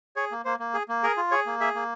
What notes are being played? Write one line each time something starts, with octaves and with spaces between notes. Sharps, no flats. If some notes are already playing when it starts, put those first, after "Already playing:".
G#4 C#5
A#3
A#3 C5
A#3
G#4
A#3
G#4 A#4
F4
G#4 C#5
A#3
G#4 E5
A#3